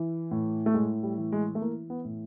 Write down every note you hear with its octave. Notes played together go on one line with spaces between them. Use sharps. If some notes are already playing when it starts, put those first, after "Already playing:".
Already playing: E3
A2
A3
A2 G#3
G3
E3
G#3
A3
E3 A#3
B3
A2